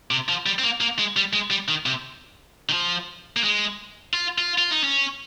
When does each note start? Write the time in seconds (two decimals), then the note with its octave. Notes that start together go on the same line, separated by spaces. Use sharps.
0.11 C3
0.29 F3
0.46 G3
0.59 C4
0.64 A#3
0.81 A#3
0.99 G#3
1.17 G3
1.33 G#3
1.50 G3
1.68 D#3
1.86 C3
2.69 D#3
2.73 F3
3.37 A#3
3.44 G#3
4.14 F4
4.38 F4
4.58 F4
4.71 D#4
4.84 C#4